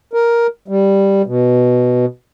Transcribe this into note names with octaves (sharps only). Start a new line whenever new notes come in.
A#4
G3
B2